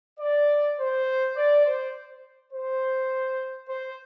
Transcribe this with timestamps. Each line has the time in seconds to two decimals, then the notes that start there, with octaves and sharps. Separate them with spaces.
0.20 D5
0.79 C5
1.36 D5
1.65 C5
2.53 C5
3.68 C5